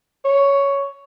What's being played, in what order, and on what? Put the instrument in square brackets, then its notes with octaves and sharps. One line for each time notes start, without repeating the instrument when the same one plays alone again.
[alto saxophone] C#5